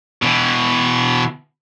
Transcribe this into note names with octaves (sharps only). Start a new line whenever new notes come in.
B2 E3